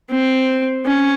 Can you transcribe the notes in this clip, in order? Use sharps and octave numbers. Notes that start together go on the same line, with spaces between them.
C4
C#4